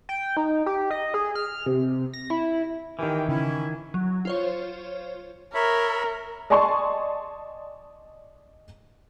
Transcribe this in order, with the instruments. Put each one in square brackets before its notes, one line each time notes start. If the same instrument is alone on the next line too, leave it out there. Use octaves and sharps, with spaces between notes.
[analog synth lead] G5
D#4
G4
D#5
G#4
F6
C3
A#6
E4
[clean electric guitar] D#3 E3 [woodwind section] G4 A#4 G5
[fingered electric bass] C#3 [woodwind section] C#4 E4
[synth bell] F#3
F4 C5 C#5
[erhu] A#4 [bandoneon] C#5 E5 B5
[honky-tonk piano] D5 D#5 G#5 A5 C6 C#6